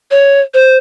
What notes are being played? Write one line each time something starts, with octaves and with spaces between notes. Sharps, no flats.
C#5
C5